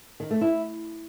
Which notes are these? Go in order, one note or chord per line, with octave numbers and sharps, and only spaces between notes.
D#3
A3
E4